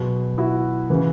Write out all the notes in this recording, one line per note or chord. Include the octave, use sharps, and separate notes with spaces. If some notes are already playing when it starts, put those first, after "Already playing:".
Already playing: B2 F#3 G#4
E4 F#4
C#3 E3